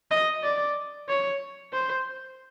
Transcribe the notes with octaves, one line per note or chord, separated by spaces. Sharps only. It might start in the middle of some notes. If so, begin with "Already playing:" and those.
D#5
D5
C#5
C5